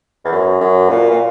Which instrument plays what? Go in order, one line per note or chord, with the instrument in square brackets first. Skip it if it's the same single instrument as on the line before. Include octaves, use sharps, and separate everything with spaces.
[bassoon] E2
F#2
F#2
A#2
A#2